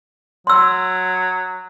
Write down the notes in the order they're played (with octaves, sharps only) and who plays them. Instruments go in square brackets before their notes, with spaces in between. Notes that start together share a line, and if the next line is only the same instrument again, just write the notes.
[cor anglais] F#3 [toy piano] C6 E6